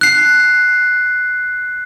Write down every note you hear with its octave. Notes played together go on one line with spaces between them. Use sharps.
F#6 C7